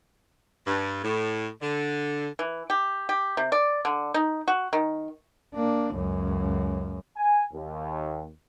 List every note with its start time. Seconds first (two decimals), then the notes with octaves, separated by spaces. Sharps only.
0.66 G2
1.03 A2
1.61 D3
2.39 E3
2.70 G4
3.09 G4
3.37 C3
3.52 D5
3.85 D3
4.14 D#4
4.48 F#4
4.73 D#3
5.55 A#3 D4
5.95 C#2 F#2
7.17 G#5
7.53 D#2